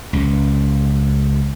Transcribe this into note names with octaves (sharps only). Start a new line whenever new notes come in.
C#2